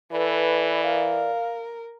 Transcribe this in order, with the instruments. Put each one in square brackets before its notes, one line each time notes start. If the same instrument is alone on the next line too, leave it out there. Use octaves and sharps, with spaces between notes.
[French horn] E3 [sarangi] A4 [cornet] B4 [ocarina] D5
[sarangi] A#4 [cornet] F5